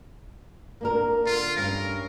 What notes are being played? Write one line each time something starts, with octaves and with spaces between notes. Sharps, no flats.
A#3 D4 A#4
D3 F4
G2 C#4 A#4